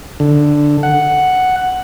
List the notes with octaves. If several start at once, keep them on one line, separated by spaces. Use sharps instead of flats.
D3
F#5